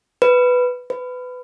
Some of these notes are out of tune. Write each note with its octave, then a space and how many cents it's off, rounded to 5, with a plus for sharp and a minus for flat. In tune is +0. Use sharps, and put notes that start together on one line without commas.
B4 +5
B4 +20